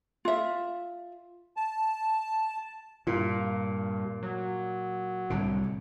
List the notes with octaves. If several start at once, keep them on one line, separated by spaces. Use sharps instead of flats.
F4 E5
A5
G2 A#2 F4
F#3
C2 A2 D3